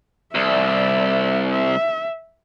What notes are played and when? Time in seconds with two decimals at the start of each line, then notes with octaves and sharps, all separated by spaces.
0.35 C2 D5 E5
1.51 E5